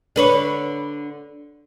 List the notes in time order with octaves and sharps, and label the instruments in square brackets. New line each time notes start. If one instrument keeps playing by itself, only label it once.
[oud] D3 B4 C#5